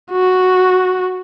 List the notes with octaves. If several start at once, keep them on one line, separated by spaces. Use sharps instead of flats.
F#4